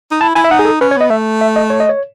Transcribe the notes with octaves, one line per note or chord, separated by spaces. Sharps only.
D#4
E4 A5
E4 G#5
E5
D#4 F#5
G#4
A4
C#4 B4
C#5
B3 D#5
A3 E5
E5
D#5
C#5
D#5
C#5